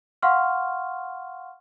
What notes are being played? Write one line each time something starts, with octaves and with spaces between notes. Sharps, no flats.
F5 F#5 C6 C#6 F6